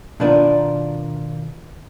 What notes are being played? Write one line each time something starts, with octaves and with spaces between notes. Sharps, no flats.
B2 D#3 B3 D4 F4 A#4